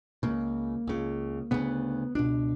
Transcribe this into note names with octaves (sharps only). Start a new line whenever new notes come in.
C#2 C#3 A#3
C#2 C#3
D2 C#3 B3
C#2 B2 D4